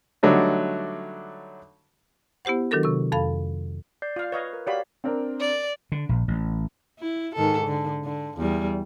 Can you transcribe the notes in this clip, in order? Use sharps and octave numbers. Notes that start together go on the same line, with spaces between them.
D3 F#3 G3 A3 D4 D#4
B3 E4 G4 C5 F#5
D#3 F#3 D4 F#4 A4 A#4
C3 C#6
F2 A4 F5 B5
D5 G6 C7
F4 F5
B4 C#5 D#5 F5
A#4
F#4 G4 C#5 D5 F5 B5
C4 D4 A#4
D5
D3
A#1
A1
E4
G#2 D#3 A4
D3
D3
E2 G3